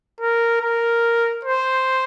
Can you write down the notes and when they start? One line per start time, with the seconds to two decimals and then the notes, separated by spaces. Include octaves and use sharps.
0.20 A#4
0.61 A#4
1.45 C5